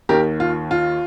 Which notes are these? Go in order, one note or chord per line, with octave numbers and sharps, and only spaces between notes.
D#2 D#3 G4 A#4
F4
F4